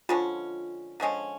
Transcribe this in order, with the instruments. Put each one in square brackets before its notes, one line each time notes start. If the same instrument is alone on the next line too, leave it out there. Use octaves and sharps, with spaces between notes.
[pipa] D3 F3 G#3 C#4 [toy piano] F4
[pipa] D3 F3 G#3 C#4